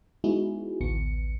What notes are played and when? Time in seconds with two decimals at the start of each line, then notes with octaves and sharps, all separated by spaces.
0.24 G#3 B3 D#4 E4 F#4 G#4
0.81 A1 D2 B3 C#7